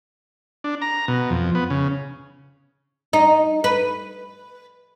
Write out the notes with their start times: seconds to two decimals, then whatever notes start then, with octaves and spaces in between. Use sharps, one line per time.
0.64 D4
0.82 A#5
1.08 B2
1.30 F2
1.55 B3
1.70 C#3
3.13 D#4
3.64 B4